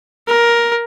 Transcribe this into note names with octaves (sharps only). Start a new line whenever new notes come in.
A#4